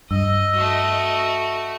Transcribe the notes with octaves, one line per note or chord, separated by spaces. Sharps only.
G2 D#5 E6
A3 F#4